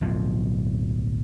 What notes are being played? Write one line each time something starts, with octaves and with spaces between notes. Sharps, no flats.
D1 B1 F2 F3